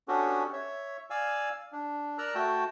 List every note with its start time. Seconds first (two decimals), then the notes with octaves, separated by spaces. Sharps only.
0.08 B3 C#4 D4 F#4 G4 A4
0.53 C#5 E5
1.10 D5 F5 G#5 E6
1.72 D4
2.18 A#4 D5 A#5 E6 F#6
2.35 A3 F#4 G5 A5